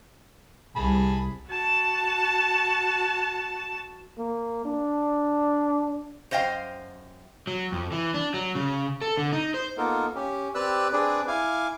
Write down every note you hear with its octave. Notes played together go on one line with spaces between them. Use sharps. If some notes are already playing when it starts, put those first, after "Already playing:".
C2 G#4 A5 B5
F#4 A5
A#3
D4
F#2 C5 D#5 F5 G5
F#3
F2
E3
D4
F#3
C#3
A4
D3
D#4
C5
A#3 B3 D#4 F4 A4 A#4
C#4 G4
C4 G4 B4 D5 E6 F#6
C4 D4 G#4 B4 D5
E4 F5 G#5 D6